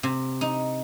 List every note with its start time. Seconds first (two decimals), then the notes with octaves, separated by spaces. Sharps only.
0.03 C3
0.41 D#4